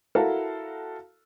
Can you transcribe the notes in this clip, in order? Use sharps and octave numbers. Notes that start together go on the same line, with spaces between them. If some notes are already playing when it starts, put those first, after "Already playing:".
E4 F#4 A4 A#4 F5